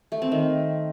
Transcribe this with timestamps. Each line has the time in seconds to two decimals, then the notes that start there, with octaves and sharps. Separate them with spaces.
0.12 A3
0.22 C4
0.32 D#3